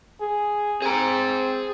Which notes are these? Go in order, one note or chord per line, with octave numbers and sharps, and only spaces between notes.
G#4
C4 G#4 A#5